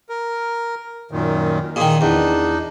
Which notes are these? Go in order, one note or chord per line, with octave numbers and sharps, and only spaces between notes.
A#4
F#2 A#2 D#3
A#2 D#3 G#4
E2 D4 D#4